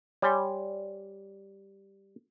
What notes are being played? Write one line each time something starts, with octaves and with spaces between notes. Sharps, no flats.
G3 C#5 G#5 C6